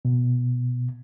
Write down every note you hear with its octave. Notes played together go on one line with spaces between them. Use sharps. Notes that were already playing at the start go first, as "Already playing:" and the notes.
B2